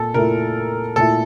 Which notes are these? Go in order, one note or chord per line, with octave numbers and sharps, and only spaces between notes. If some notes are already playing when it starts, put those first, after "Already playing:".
Already playing: A#2 A4
A#2 A3 E4 A#4
A#2 A3 E4 A4